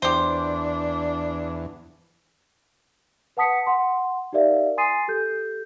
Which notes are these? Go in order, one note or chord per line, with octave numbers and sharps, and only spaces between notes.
E2 D4 G4 C5
B4 F#5 A5 D#6 B6 C#7
F#5 C6
D#4 G4 A#4 D5 E5 F5
G#5 C6 D#6 A6 C7 D#7
G4 A4 G6